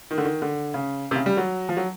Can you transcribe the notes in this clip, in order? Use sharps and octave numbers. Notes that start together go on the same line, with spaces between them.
D#3
D3
D#3
D3
C#3
C3
C#3
G3
F#3
F3
F#3